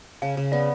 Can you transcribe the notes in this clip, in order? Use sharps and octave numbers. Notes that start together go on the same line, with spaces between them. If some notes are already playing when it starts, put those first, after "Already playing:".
C#3 F5
C#3
B3 D5